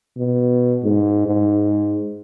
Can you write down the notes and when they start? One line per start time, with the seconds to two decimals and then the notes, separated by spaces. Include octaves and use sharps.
0.18 B2
0.84 G#2
1.27 G#2